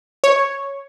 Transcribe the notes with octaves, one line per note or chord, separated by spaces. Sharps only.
C#5